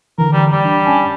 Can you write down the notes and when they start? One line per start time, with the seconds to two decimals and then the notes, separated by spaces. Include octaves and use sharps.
0.18 D3 E3 A#4
0.33 G3
0.52 G3
0.65 D4
0.86 C#4 G#5 A5